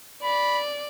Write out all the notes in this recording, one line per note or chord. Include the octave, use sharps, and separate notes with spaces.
D5 B5